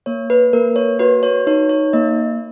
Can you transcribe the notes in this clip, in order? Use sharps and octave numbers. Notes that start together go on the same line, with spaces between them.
A#3 C#5
B4
A#3 A#4
C#5
F#4 B4
C#5
D#4 C#5
C#5
A#3 D#5